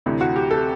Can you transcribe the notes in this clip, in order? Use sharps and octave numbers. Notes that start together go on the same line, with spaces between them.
D2 C3 E3
F#4
G4
A4